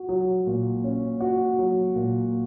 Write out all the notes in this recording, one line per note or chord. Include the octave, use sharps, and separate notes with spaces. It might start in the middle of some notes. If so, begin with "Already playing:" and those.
Already playing: F#4
F#3
A#2
C#4
F#4
F#3
A#2